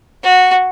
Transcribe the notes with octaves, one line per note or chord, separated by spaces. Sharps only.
F#4